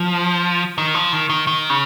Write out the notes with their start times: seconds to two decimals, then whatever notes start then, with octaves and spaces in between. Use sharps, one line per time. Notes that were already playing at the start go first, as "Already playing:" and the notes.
Already playing: F3
0.78 D#3
0.94 F3
1.13 D#3
1.30 D#3
1.47 D#3
1.69 C#3